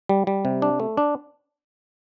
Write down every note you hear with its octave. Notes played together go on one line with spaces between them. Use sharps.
G3
G3
C3
D4
A3
D4